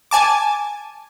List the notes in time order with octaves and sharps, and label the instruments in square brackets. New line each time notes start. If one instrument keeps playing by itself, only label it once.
[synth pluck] G#5 A5 D6